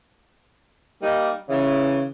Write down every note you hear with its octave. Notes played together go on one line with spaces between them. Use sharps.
G3 A#3 D#4
C#3 E3